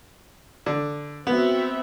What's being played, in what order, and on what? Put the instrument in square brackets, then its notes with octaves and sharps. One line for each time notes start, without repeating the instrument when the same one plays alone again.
[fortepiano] D3
[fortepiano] B3 [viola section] C4 F#4 E5